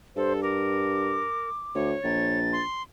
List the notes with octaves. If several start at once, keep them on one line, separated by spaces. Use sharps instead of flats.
G2 A4 C5
A#4 D6
D2 C#5
A#1 A6
C6